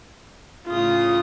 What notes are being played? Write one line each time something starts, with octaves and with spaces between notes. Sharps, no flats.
A2 C#3 F4 D#6